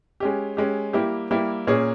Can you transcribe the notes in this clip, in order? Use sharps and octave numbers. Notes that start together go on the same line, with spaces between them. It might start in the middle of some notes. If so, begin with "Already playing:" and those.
G#3 C#4 G4
G#3 C#4 G4
G3 A#3 E4 G4
G3 A#3 E4 G4
A#2 A#3 C#4 G#4 C#5